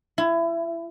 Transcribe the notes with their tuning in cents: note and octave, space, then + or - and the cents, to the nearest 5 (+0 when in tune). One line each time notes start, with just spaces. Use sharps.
E4 +25